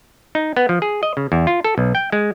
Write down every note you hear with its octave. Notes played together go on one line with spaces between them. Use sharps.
D#4
B3
F3
G#4
D#5
C#3
E2
F4
A4
B1
G5
G#3